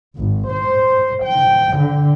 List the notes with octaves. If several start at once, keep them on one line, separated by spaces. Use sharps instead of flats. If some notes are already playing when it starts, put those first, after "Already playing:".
G#1
C5
G5
D3